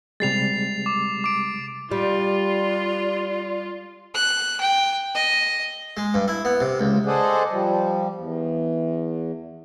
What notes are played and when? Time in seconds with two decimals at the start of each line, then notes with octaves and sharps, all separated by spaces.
0.20 C3 G3 G#3 A6 C7 F7
0.86 D6
1.24 D6 D7
1.91 G3 F4 D5
4.15 F#6
4.61 G5
5.15 D#5
5.97 G#3
6.14 G2
6.28 E4
6.45 B3
6.60 C3
6.80 C#2
7.04 G#4 A4 C5 D5 D#5 F#5
7.51 F3 G3
8.15 E2